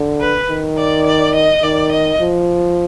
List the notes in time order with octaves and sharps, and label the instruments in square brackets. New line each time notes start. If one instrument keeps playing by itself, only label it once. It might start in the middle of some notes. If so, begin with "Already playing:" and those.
Already playing: [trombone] D3
[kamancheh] B4
[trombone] D#3
[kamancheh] D5
D5
D#5
[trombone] D#3 [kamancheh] D5
[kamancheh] D#5
[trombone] F3